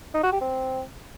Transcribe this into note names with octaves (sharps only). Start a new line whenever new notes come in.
D#4
F#4
G4
C4